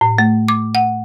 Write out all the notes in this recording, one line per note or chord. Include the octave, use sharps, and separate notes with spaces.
A2
A3
D6
F#5